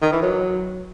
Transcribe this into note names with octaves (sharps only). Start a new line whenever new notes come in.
D#3
E3
F#3